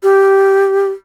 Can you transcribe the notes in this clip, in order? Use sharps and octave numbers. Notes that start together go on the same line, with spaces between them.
G4